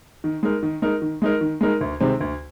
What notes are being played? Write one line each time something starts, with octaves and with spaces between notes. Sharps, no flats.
D#3
G#3 D#4 A#4
D#3
G#3 D#4 A#4
D#3
G#3 D#4 A#4
D#3
G#3 D#4 A#4
D2
C3 D#3 G#3 C4
D2